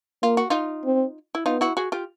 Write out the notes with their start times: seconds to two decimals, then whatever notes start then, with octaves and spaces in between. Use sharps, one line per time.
0.23 A#3 F4
0.37 F#4
0.50 D#4 F4
0.85 C4
1.35 E4
1.46 B3 D#4 F4
1.61 E4 F#4
1.77 F#4 G#4
1.92 F4 G4